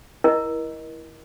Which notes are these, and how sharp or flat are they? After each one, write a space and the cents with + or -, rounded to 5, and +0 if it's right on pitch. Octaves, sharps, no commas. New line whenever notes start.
E4 -5 A#4 +30 D#5 +0